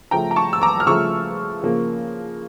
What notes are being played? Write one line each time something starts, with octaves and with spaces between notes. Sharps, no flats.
C#3 F3 A3 G5 A#5
A#5
A5 C#6
E6
A#5 D6
F6
C#3 F3 A3 C#6 E6
C#3 F3 A#3